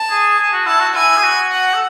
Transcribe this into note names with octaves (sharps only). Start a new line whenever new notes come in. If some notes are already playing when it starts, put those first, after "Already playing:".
Already playing: A5
G#4
G#4
F#4
E4 A5
F#4
E4 G#5
G#4
F#4
F#5
A4